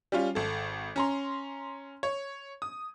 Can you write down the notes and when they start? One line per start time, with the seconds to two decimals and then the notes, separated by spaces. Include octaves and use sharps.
0.12 G3 C#4 F4
0.35 G#1 A4
0.96 C#4 A#5 C6
2.03 C#5
2.62 D#6